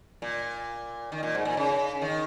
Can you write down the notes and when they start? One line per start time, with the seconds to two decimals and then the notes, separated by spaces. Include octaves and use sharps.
0.22 A#2
1.12 D#3
1.23 A#2
1.35 G#2
1.45 A#2
1.57 C#3
2.02 D#3